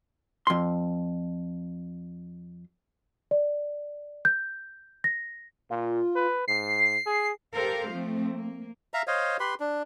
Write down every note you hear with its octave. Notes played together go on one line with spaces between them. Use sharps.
F2 C6
D5
G6
A#6
A#2 F4
B4
G#2 C7
G#4
G4 A4 A#4 C5 F5
F3 A3 C4
A#3
E5 F5 A#5
C5 C#5 D#5 F5
G4 B4 B5 C6
D4